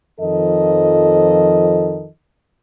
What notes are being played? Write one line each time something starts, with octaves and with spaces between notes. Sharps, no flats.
F2 D#3 F3 A4 D#5